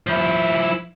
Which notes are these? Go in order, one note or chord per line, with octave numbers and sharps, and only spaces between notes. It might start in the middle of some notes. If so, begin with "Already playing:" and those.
F3 E4